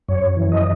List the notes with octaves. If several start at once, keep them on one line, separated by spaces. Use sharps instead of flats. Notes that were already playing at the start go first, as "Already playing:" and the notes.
F#2 C#5
E3
D#5